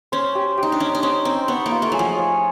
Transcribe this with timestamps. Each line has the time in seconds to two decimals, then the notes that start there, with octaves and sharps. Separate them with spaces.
0.12 C#4 C5
0.35 G4
0.57 G4
0.63 D#4
0.72 D4
0.80 C#4 D#4
0.95 D4
1.03 C#4 C5
1.25 C4 D#4
1.48 B3 C#5
1.66 A#3
1.71 F4
1.82 A3
1.92 F#3 G#4
1.99 F3
2.16 C#5